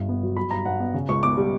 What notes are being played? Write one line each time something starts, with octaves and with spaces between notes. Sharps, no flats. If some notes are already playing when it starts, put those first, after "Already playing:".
Already playing: G1 G2
B3
F#3
F#3 B5
G2 A#5
G2 F#5
B3
C#3
C#2 C#6
B3 D6
G3